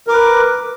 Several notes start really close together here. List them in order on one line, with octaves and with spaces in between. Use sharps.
A#4 D6 B4